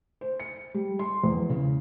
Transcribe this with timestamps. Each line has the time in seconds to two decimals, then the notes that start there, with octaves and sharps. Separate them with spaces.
0.21 C5
0.40 C#7
0.74 G3
0.99 C6
1.24 E2
1.49 C#3